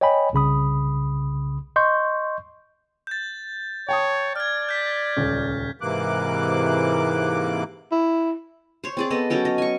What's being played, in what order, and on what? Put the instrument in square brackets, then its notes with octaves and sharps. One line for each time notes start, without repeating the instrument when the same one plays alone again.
[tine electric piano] C#5 D#5 G5 G#5 B5
C2 C#3 B5 D#6
D#5 C6 C#6 G6
[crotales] G6 A6
[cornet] C#5 [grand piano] G5 A5 D#6
[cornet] D5 [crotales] F6 G#6
[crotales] G6 B6
[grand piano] D#1 C#2 C#4
[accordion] G#2 C3 E3 A#3 D6 F#6
[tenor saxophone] E4
[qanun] C5 C#5
C4 G#4 D5
B3 G#4 A4 D#5
F#3 C#4 A4 G5
D#5
G#5 C#6